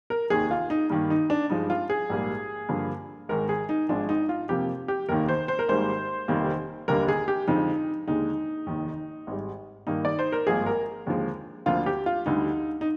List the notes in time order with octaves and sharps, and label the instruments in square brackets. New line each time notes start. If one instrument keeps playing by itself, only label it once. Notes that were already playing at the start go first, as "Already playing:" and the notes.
[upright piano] A#4
F1 D#2 D#3 G#4
F4
D#4
G2 D#3 A#3
D#4
D4
G2 F3 G#3 D#4
F4
G#4
A#1 G#2 G3 A#3
G2 D3 F3 A#3
G#1 G#2 D#3 A#4
G#4
D#4
G#1 G#2 F3 D4
D#4
F4
F2 C3 F3 A#3 G4
G4
F1 D#2 D#3 A#3 A#4
C5
C5
A#4
G#1 G#2 D#3 G3 A#3 C5
F1 F2 D#3 G3 A#3
F1 D#2 D3 G3 A#3 A#4
G#4
G4
F2 D3 F3 G#3 D#4
D#2 D3 G#3 D#4
F1 D#2 D#3
G#1 G#2 G3
G2 D#3 A#3 D#4
D5
C5
A#4
G#1 G2 F3 A#3 G#4
A#4
D#2 D3 F3 G#3
D2 D3 F3 A#3 F4
G4
F4
D2 D3 G3 D#4
D#4